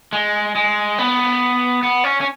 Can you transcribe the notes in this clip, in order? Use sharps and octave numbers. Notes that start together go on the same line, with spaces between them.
G#3
G#3
B3
B3
C#4
C#4